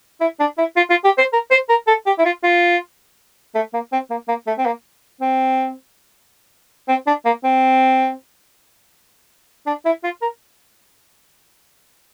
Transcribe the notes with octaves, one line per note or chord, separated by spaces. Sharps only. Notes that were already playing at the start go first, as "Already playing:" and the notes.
E4
D4
E4
F4
F4
G4
C5
A#4
C5
A#4
A4
G4
E4
F4
F4
A3
A#3
C4
A#3
A#3
A3
C4
A#3
C4
C4
D4
A#3
C4
D4
E4
F4
A#4